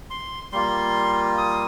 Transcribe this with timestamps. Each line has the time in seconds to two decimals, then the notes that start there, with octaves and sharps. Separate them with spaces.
0.10 C6
0.52 G3 A#3 F4 C6
1.38 D#6